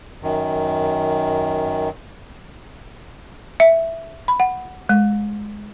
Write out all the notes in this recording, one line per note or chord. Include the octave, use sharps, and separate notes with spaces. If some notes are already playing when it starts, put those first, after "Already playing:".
F#2 D#3
E5
B5
F#5
G#3